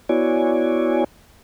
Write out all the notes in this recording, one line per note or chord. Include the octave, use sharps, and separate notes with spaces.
B3 E4 F#4 C#5 D5 G#5